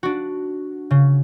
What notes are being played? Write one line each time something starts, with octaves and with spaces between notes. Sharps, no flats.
D4 F#4
C#3